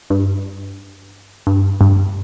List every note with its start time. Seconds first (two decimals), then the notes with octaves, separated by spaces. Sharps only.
0.10 G2
1.47 G2
1.81 G2